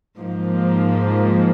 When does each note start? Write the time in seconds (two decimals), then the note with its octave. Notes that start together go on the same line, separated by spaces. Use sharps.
0.19 G#2 F3 A#3